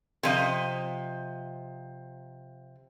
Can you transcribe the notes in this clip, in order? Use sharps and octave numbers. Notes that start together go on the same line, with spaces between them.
C3 F3 D#5